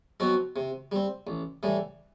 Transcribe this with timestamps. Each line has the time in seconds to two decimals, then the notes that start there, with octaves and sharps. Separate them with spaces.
0.20 B2 F#3 C4 F#4
0.56 C3
0.92 G3 C4
1.27 A1
1.63 A2 E3 G3